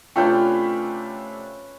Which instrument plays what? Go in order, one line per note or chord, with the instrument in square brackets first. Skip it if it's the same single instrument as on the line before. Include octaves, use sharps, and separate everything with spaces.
[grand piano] C3 A3 D4 [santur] C#4 B4 [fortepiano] F4 [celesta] G5 G6